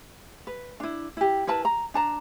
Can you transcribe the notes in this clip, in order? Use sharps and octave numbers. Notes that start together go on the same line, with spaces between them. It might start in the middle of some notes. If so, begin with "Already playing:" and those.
B4
D4 E4
E4 G4
E4 A#4 B4 A5
A#5
D4 A5 A#5